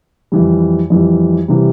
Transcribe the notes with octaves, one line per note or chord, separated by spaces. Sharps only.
F2 E3 G3
F2 E3 G3
C3 E3 G3